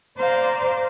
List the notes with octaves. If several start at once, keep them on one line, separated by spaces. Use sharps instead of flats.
C5 D5 F5 A#5